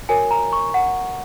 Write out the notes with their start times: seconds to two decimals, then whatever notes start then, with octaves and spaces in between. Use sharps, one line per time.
0.09 F#4 A#4 C#5 G#5
0.31 A#5
0.53 C#6
0.74 F#5